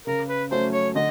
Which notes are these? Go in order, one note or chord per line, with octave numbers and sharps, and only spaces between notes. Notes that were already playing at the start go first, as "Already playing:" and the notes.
C#3 A#4
B4
F#3 A3 C#4 C5
C#5
D3 D#5